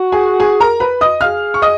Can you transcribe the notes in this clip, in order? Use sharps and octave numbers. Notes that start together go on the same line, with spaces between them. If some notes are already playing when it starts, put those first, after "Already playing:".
Already playing: F#4
G#4 G#5
G#4 G#5
A#4 A#5
B4 B5
D#5 D#6
G#4 F5 F6
C#6
D#5 D#6